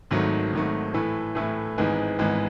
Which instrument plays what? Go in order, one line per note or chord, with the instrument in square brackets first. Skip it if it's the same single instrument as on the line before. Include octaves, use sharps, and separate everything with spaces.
[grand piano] G#1 G#2 D#3 F#3 A3
G#1 G#2 D#3 F#3 A3
A2 E3 A3 E4
A2 E3 A3 E4
G#1 G#2 E3 G#3 B3
G#1 G#2 E3 G#3 B3